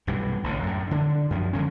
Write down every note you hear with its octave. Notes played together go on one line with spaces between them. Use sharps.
B1 G2 C3 E3
A1 D3
F#2 A2
D3 D4
F#2 F3
D3 F3 G#3 C#4